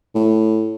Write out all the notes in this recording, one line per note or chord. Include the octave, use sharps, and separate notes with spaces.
A2